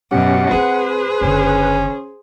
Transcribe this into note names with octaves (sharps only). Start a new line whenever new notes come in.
F#2 B2 C#4 G4 F#5
C4 F4 G#4 B4 C5
F#1 D3 C#4